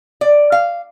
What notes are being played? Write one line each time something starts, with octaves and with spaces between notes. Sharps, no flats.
D5
F5